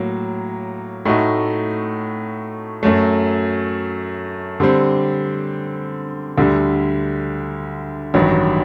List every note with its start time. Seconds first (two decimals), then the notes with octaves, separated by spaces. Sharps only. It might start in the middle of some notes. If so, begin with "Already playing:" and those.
Already playing: A2 F#3 A#3
1.05 A2 A3 D#4 F#4
2.83 F#2 F#3 A3
4.60 D3 G3 C4
6.38 D2 D3 G3
8.14 A1 G2 D#3 F#3